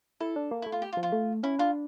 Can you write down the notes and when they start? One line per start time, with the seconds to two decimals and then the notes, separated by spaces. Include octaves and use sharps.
0.20 E4 A4
0.36 D4
0.51 A#3
0.62 A3 E4
0.72 F4
0.82 G4
0.93 F4
0.97 F3
1.03 F4
1.12 A3
1.43 C#4 E4
1.59 D4 F4